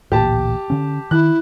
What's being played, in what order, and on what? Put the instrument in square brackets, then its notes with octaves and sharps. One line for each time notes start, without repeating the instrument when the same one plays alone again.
[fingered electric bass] D1 A1 A#2 [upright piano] G4 A5
[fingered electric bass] D3 C#4
[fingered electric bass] D#3 [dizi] E4 [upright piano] F#6